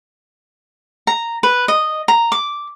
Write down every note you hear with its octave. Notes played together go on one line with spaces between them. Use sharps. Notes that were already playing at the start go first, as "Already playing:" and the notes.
A#5
B4
D#5
A#5
D6